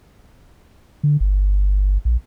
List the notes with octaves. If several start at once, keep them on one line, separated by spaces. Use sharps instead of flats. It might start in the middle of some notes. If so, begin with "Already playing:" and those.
D3
G1
A#1